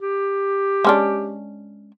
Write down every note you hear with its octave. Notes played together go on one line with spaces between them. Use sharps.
G4
G#3 C#4 D4